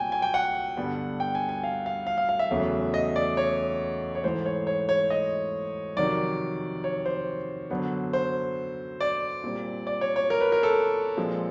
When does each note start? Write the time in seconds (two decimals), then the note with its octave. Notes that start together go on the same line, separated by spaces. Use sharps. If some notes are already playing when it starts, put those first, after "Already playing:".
Already playing: C2 A#2 G5 G#5
0.12 G#5
0.22 G5
0.34 F#5
0.77 G2 D3 G3 B3
1.20 G5
1.35 G#5
1.49 G#5
1.64 F5
1.86 F5
2.07 F5
2.18 F5
2.29 F5
2.39 E5
2.51 E2 C#3 F#3 A3
2.94 D#5
3.16 D5
3.37 C#5
4.15 C#5
4.24 G#2 E3 A3 C5
4.46 C#5
4.67 C#5
4.89 C#5
5.10 D#5
5.96 F2 C3 D#3 F#3 D5
6.84 C#5
7.06 C5
7.70 F#2 D3 F#3 B3
8.13 C5
9.01 D5
9.44 A#2 G3 C4
9.87 D5
10.01 C#5
10.16 C#5
10.30 A#4
10.41 B4
10.52 A#4
10.63 A4
11.17 A#2 F3 G#3 C4